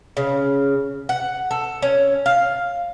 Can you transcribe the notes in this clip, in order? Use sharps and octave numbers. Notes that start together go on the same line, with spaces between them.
C#3
F#5
A4
C#4
F5